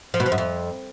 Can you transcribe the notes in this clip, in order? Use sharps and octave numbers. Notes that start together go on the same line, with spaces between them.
F3
B2
F3
F#2
F2